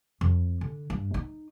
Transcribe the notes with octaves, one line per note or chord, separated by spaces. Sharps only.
F2
D3
G2
D#4